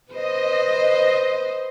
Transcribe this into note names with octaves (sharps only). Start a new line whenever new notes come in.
B4 C5 D#5